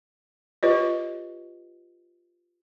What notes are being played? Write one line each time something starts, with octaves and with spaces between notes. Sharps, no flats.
F4 G4 B4 C#5 D#5